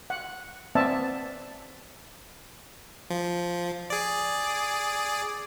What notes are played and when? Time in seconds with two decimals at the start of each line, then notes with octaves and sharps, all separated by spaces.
0.10 F#5
0.75 B3 C4 D5 E5 A5
3.10 F3
3.90 G#4 D5